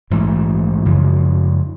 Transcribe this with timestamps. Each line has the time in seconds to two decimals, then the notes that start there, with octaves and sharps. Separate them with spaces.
0.10 A#1 G#2 E3 A3
0.85 F#2 C#3 F3 G#3